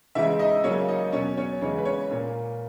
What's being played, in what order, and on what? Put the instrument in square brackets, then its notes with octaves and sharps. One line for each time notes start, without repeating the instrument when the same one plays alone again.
[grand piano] C#3 E3 G#3 D#4 E4 E5
D#4 D#5
C#3 F#3 A#3 C#4 C#5
D#4 D#5
B2 F#3 C#4 C#5
C#4 C#5
C#3 E3 G#3 C#4 C#5
B4
C#4 C#5
A#2 A#3 C#4